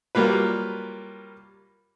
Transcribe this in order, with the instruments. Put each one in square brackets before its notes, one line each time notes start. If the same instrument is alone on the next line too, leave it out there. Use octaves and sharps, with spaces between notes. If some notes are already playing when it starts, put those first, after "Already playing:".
[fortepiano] F#3 G3 A#3 F4 B4